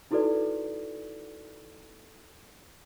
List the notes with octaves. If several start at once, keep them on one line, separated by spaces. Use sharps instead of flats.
D#4 E4 F#4 A4 B4 D5